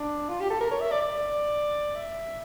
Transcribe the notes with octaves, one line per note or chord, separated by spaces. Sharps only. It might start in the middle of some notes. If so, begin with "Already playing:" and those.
Already playing: D4
F4
G4
A4
A#4
C#5
E5
D5
D5
E5